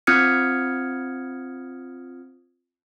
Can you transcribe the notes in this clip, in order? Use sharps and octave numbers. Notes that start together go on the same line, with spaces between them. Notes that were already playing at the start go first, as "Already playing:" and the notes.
C4 F4 D#6 F6 G#6 C#7